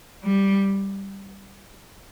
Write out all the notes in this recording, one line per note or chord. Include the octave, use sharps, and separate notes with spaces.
G3